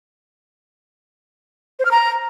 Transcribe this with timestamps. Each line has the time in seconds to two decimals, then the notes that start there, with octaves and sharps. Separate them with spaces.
1.79 C5
1.85 F6
1.91 A#5